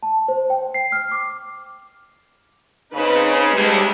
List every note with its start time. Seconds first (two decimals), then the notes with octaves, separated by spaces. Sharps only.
0.03 A5
0.28 C5
0.50 G5
0.74 C7
0.92 F6
1.12 D6
2.93 C#3 C4 D#4 B4
3.54 D2 G3 G#3